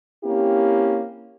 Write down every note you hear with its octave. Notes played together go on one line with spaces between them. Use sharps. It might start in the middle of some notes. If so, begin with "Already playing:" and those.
A#3 C4 C#4 E4 G4